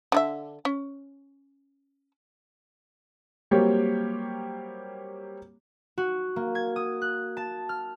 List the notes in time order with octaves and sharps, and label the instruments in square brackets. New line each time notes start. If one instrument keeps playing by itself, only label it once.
[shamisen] D3 G4 E5
C#4
[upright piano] F#3 G3 A#3 C4 G4 C#5
[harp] F#4
A#3
G#6
D#6
F#6
A5
F6